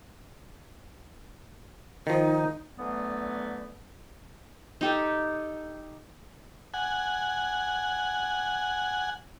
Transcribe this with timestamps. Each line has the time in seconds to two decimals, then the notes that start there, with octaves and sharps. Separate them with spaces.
2.07 D#3 F3 D#4
2.77 D3 E3 F#3 G3 A3 B3
4.81 D#4 G4 A4
6.74 F#5 G#5